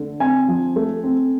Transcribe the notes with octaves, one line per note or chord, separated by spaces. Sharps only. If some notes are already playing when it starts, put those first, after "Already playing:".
Already playing: D3 A3
C4 G#5
F3
A3
C4